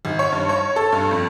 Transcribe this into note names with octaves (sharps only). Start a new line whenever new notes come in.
G#1
C#5
G2
C#5
A4
G2
F2